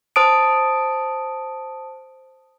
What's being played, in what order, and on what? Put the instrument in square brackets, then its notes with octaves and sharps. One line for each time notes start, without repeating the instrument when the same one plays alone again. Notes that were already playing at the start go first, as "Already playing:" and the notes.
[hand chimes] C5 A5 D#6 D7